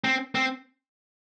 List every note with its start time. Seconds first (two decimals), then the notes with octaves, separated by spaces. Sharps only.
0.04 C4
0.35 C4